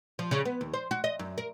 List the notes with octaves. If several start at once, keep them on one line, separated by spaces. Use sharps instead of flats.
F3
C#3
B3
D#2
C5
F#4
D#5
F#2
A#4